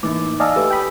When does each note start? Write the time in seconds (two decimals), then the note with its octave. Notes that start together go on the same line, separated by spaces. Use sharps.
0.03 A2 E3 A#3 D#4 D6
0.40 D5 D#5 F5 G#5 A5 E6
0.56 A3 G4 B4 E6
0.70 G5 B5 D#6